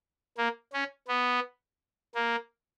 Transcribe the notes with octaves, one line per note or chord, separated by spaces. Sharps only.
A#3
C#4
B3
A#3